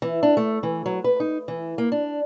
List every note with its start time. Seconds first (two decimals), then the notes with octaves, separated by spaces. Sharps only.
0.02 E3
0.23 D4
0.37 A3
0.63 E3
0.86 F#3
1.04 B4
1.20 D#4
1.48 E3
1.78 A#3
1.92 D4